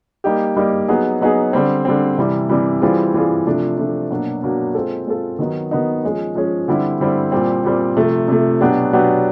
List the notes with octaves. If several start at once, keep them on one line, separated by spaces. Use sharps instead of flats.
G3 A#3 D#4 G4
G3 A#3 D#4 G4
F#3 B3 D#4 G#4
F#3 B3 D#4 G#4
D3 G3 C4
D3 G3 C4
C3 E3 G3
C3 E3 G3
E3 G3 C4 F4 G#4
E3 G3 C4 F4 G#4
C3 F3 A3 D4
C3 F3 A3 D4
B2 F#3 A#3 D4
B2 F#3 A#3 D4
G#3 C4 F4 A4
G#3 C4 F4 A4
D#3 F#3 B3 D#4
D#3 F#3 B3 D#4
F3 G#3 C#4
F3 G#3 C#4
D3 G3 C4 E4
D3 G3 C4 E4
A#2 G3 C4
A#2 G3 C4
C3 F3 A3
C3 F3 A3
B2 F#3 B3 D4 G4
B2 F#3 B3 D4 G4